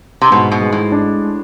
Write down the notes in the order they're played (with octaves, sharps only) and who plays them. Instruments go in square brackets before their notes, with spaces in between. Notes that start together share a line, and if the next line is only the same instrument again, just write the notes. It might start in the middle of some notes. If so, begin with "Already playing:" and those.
[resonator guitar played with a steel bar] C3
[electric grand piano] G#2 [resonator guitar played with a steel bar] B2
[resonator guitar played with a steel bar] B2
[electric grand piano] G#3
[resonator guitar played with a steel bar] A2
[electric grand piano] D4